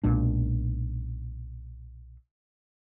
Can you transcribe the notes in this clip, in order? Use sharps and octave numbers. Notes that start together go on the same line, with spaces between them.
B1 A#2 G#3 D4